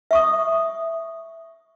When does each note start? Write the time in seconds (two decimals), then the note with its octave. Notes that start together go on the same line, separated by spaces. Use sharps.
0.11 E5 C#6 D#6